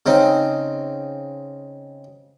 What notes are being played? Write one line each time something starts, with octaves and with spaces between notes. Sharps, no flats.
C#3 C4 D#4